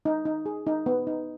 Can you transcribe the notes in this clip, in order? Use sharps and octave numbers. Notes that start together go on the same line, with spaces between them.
D#4
D#4
G#4
D#4
B3
D#4